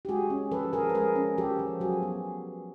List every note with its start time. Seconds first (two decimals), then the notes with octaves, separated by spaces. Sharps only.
0.05 G4
0.08 G#3 F#4 G#4
0.30 C#4
0.51 F3 A4 B4
0.73 F3 G#4 A#4
0.89 B4
0.95 G#3 G#4 A#4
1.16 C#4
1.38 F3 G4 A4
1.59 F3
1.80 F#3 F#4 G#4
2.02 B3